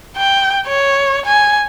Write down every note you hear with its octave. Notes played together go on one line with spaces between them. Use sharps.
G5
C#5
G#5